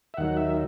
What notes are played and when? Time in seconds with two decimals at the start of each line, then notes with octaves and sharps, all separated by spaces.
0.14 E5
0.17 D#2 D#3 F#3 F#5
0.37 E5